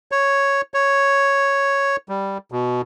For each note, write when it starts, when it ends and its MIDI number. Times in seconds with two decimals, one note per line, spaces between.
0.12 0.61 73
0.74 1.96 73
2.09 2.38 55
2.52 2.82 47